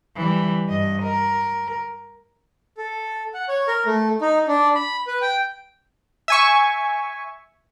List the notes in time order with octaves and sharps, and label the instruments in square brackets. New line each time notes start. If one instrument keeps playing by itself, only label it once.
[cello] E3 G3
G2 D#5
A#4
[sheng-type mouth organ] A4
F#5
C#5
A#4
A3
D#4
D4
B5
B4
G5
[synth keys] E5 G#5 C#6